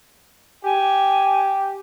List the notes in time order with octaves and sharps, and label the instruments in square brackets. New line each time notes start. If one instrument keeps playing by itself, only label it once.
[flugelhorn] G4 [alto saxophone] G#5